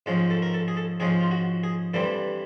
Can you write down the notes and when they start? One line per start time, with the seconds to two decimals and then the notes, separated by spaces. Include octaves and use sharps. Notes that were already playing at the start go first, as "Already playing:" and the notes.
0.06 G#2 F3 G#3 C#4
0.30 A4
0.42 A#4
0.54 A4
0.68 G#4
0.77 A4
1.00 G#2 F3 G#3 C#4 G#4
1.21 F4
1.31 F#4
1.63 G#4
1.94 G2 E3 G3 C4 A4